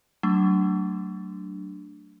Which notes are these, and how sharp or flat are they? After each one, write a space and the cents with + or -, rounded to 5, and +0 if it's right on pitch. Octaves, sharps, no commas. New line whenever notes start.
F#3 +30 A3 +20 D4 +0